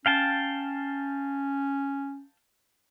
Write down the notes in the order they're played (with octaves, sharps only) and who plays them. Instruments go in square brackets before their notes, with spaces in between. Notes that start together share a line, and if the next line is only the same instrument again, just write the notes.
[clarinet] C#4 [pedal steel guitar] F5 G5 A5